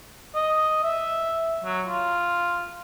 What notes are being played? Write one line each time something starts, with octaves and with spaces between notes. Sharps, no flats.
D#5
E5
F#3
F4